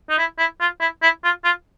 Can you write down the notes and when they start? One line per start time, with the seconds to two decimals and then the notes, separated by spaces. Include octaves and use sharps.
0.10 D#4
0.18 E4
0.39 E4
0.60 F4
0.80 E4
1.02 E4
1.24 F4
1.44 F4